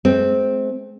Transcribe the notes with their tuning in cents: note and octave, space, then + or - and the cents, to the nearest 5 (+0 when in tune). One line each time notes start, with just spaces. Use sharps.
G#3 +40 C4 -5